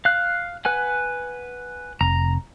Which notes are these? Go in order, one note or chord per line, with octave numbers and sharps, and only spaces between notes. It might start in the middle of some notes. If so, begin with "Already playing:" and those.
F5 F#6
B4 F#5 G#5
F1 A#5